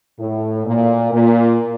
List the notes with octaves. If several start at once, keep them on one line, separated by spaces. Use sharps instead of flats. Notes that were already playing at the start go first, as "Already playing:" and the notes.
A2
A#2
A#2